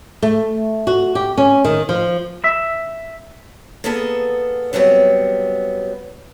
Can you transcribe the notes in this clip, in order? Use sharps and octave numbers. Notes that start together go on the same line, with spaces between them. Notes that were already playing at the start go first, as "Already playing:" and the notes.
A3
F#4
G4
C#4
D#3
F3
E5
A#3 B3 G#4 A4 F#5
F#2 F#3 G3 A3 B3 C4